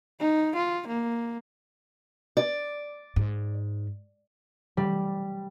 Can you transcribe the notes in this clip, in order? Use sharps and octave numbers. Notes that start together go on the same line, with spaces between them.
D#4
F4
A#3
D5
G#2
G3